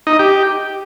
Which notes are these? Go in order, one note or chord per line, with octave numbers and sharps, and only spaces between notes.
D#4
D#5
G4